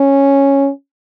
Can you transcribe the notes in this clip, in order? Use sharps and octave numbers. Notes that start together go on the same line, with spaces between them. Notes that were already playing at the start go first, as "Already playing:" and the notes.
Already playing: C#4